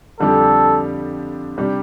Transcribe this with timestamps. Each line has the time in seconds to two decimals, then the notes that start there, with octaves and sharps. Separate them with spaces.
0.20 F2 D3 G3 D4 G4 A4
1.57 C3 G3 D4 G4